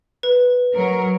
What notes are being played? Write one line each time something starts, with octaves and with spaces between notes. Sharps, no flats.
B4
F#3 A#4